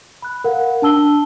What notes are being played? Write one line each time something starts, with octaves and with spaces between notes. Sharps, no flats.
B5 F#6
A#4 F5 F#5
D4 A5 E6 G7